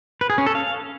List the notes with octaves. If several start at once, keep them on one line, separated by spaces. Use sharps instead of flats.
B4
G#4
C#4
A4
F5